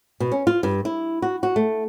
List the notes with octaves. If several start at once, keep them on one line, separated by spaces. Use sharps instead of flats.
B2
C#4
F4
G2
E4
F#4
F#4
A3